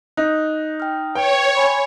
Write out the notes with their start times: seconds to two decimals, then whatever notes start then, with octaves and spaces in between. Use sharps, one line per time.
0.17 D#4 F#6
0.80 G5 F6
1.15 B4 C#5 G5
1.55 G#5 B5 C6